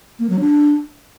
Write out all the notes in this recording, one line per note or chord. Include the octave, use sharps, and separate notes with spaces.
A#3
F#3
D4